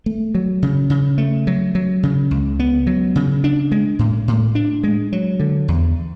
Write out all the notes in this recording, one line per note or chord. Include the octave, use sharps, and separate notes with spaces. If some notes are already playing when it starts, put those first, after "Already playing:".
A3
F#3
C#3
C#3
A3
F#3
F#3
C#3
C#2
B3
F#3
C#3
D4
G#3
A2
A2
D4
G#3
F#3
D3
E2